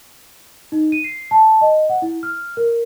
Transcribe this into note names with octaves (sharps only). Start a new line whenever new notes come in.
D#4
D#7
C7
A5
D#5
F#5
E4
F6
A#4